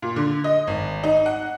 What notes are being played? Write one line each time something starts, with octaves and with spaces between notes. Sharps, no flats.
A#2
D3
D#5
G#1
D#4
F#5